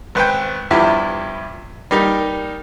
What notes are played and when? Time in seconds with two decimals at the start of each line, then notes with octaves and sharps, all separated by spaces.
0.15 G#1 B4 C5 G5
0.71 E2 G2 F3 E4 G4
1.91 G3 A#3 D#4 G4